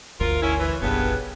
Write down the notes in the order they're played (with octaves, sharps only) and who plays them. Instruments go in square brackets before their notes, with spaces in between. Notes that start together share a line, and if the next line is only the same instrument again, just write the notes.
[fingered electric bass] G1 D2 [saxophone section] F4 A#4
[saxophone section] C#4 E4
E3
[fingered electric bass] F#1 B1 [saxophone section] G2 C#3 B3